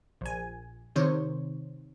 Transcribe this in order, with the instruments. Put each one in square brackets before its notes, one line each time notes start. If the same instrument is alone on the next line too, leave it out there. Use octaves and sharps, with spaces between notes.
[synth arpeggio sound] A#1 G#5
C3 D#3 C5 C#5